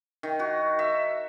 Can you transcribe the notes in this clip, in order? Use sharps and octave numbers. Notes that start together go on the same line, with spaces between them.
D#3
F#4
E5